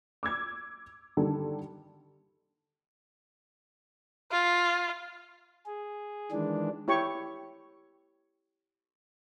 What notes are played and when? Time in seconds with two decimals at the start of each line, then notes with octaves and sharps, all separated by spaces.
0.23 D6 E6 G#6
1.17 D3 D#3 G3 A4
4.31 F4
5.66 G#4
6.32 D#3 E3 G#3 D4
6.88 E4 G4 C#5 G5 C#6